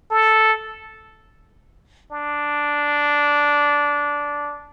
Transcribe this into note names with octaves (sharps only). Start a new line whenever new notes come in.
A4
D4